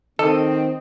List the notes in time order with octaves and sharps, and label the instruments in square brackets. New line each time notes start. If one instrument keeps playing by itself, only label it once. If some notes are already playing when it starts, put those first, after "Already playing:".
[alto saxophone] D#3 [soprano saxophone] C4 [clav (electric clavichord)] A4 [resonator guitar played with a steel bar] D#5